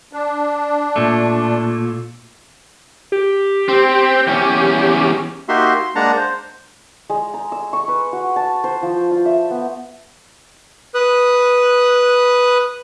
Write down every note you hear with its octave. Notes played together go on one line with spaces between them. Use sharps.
D4
A#2 A3
G4
C4
E2 C#4
A#3 D#4 F#4 G4 E5 C6
C6
G#3 A#3 D4 F#5 A5 A#5
C5
G#3
A#5
E6
C#6
B4
F#4
A5
C5
F3
F4
E5
B3
B4 D#6 F#6